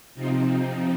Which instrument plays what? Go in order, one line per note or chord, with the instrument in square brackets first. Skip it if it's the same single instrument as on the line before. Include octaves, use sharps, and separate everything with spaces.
[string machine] C3 F3 C4 D#4